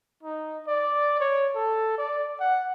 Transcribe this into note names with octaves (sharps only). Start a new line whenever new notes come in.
D#4
D5
C#5
A4
D5
F#5